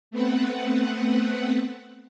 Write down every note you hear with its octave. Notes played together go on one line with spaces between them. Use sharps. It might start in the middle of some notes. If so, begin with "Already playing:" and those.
A3 B3 C4 B4 F#5